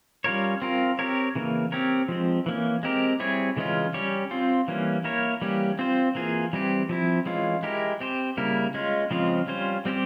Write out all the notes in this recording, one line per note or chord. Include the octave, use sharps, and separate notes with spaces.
G3 C#4 F4 A#4 C#5
C4 F4 A#4
C4 G4 A#4 C#5
C#3 E3 A#3
C4 G4 A#4 C#5
F3 G#3 C4
E3 A#3 C#4
G#3 C4 G4 A#4
G3 C4 E4 G#4 C#5
C#3 E3 G#3 C#4 F4
G3 C#4 G4 C#5
C4 F4 C5
E3 G3 A#3 C#4
A#3 E4 A#4 C#5
E3 G3 A#3 C#4 G4
C4 F4 C5
E3 A#3 F4 G#4
E3 G3 C4 G4
F3 C4 E4
E3 G#3 C#4 F4
G#3 E4 G4 A#4
C4 G4 C5
C#3 G3 A#3 E4 A#4
G#3 C#4 F4
C#3 F3 G#3 C4 F4
G3 C#4 F4 C5
G3 C4 G4 C5